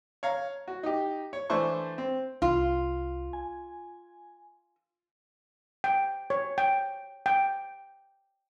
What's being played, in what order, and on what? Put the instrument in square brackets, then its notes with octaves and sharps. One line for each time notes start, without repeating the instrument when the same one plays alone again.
[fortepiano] C#5 F5 A#5
F#4
D#4 G4
C#5
E3 A3 D4 C5 E5 C#6
C4
[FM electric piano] C2 [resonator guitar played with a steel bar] F4
[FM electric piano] G#5
[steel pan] G5
C#5
G5
G5